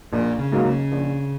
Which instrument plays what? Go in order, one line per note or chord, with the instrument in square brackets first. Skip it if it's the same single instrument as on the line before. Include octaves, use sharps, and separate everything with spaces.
[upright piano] A#1 [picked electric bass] A#2
[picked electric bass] C#3
[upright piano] G#2 F#3 A#3
[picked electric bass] C#3
[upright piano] A#1